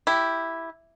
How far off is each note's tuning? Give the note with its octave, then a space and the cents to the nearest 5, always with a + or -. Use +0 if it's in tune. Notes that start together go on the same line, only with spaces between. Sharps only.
E4 +0 G4 +0